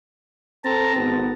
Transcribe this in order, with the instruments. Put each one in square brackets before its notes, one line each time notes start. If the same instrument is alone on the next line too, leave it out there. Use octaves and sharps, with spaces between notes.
[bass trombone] C4 [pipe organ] A4 A5 A#5
[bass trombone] G#1 [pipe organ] B3